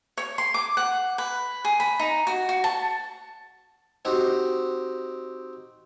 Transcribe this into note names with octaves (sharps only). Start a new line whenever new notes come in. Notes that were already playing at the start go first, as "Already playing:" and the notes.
C#5
C6
D6
F#5
B4
G#4
B5
D#4
F#4
F#4
A5
C4 D#4 F#4 G4